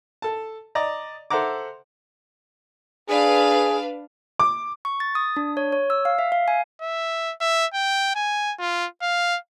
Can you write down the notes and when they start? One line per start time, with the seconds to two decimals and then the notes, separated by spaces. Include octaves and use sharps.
0.22 A4 A5
0.75 D5 D#5 A#5
1.30 A4 C5 E5 F#5 A#5 D6
3.09 D4 G#4 B4 F5
4.39 D6
4.85 C#6
5.00 A6
5.15 D#6
5.37 D4
5.57 C#5
5.72 C#5
5.90 E6
6.05 F5
6.19 E5
6.32 F5
6.48 G#5
6.82 E5
7.41 E5
7.74 G5
8.15 G#5
8.59 F4
9.02 F5